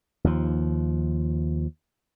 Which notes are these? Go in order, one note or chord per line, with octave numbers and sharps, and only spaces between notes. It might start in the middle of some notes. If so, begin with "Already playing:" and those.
D#2 F3